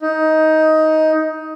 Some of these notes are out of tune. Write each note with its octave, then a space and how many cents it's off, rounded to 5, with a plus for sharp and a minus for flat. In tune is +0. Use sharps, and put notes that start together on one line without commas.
D#4 +15